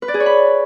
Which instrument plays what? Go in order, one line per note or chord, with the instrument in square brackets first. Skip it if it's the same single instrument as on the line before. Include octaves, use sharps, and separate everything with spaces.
[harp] B4
D5
G#4
C#5
B5